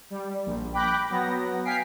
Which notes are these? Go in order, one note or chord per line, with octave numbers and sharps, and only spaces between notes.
G3
A#1
G5 B5 D6 F#6 G6 A#6
F#3 B3 A#6
F5 G5 G#5 B6 C7 D7